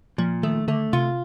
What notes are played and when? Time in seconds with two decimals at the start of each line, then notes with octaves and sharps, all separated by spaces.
0.18 A#2 F3
0.43 D#3 A3
0.68 D3 A3
0.93 C3 F4